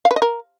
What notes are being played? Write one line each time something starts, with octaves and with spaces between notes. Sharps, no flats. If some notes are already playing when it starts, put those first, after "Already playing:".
F5
B4
D#5
A#4